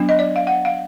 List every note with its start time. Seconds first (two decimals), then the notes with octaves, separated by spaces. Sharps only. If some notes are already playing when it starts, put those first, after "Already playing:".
Already playing: F#3 B3 D4
0.09 D#5
0.19 D5
0.36 F5
0.47 F#5
0.65 F5